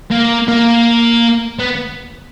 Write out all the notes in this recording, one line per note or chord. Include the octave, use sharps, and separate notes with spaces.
A#3
A#3
B3